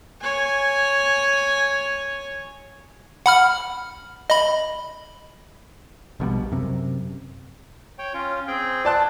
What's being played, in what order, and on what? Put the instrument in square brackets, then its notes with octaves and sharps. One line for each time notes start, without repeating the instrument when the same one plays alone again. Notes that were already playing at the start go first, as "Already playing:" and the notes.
[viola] C#5 G#5
[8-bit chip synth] F#5 B5 F6
D#5 B5
[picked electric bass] A#1 B2 D3 G3
F#2 C3
[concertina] C#5 G5
C#4 F4
C4 G#4 G5
[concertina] F4 [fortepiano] D5 A5 F#6